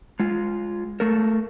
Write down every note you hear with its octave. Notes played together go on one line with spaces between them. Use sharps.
G#3 F4
A3 A4 A#4